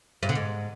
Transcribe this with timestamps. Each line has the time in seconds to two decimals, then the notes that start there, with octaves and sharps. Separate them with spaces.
0.23 G2
0.29 D3
0.35 G#2